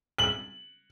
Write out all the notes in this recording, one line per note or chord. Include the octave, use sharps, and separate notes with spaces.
F#7